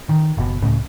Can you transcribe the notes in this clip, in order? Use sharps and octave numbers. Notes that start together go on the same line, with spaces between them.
D#3
F#1 B2
C#2 A2 C#3